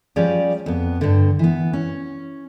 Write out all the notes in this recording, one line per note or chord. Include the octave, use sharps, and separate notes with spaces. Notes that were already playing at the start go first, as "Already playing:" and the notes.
F3 G3 C#4 G4 G#4 D5
F2 B3
G2 D3
E3 B3
C#4